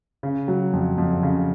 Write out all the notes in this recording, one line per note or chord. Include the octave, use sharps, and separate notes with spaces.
C#3
F#3
F2
F2
C#3